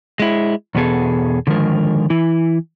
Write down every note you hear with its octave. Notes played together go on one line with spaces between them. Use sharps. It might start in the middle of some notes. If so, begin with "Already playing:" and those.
G#3 E4
E2 B2 B3 G#4 A4
D3 D#3 F3 G#3 A#4
E3 E4